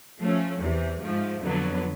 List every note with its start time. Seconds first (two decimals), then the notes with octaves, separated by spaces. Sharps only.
0.19 F3 A3 C#4
0.59 E2 C3 E3
1.01 G#2 F3 A3
1.42 F2 D3 F#3 B3